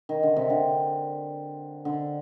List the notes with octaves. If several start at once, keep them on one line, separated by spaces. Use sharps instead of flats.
D#3
D3
C3
D3
D3